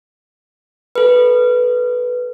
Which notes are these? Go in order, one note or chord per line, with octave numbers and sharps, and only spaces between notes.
A4 B4